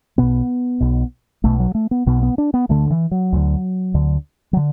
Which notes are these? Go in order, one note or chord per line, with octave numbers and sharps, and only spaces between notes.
B1 B2 B3
B1 B2
B1 B2 A3
F#3
A3
B3
B1 B2 B3
B3
D4
B3
D2 D3 A3
E3
F#3
D2 D3
D2 D3
F#3
D3